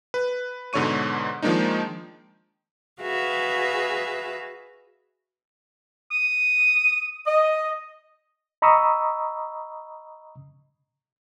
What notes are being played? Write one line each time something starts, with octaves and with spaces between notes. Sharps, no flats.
B4
G#2 B2 D3 C#5 C#6 D#7
D#3 F3 G#3 A#3 D4 D#4
F#4 G#4 B4 E5 F5
D#6
D#5
D#5 A#5 B5 C#6 D#6 E6